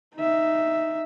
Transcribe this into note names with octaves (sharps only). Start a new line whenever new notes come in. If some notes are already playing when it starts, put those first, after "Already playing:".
D#4 E5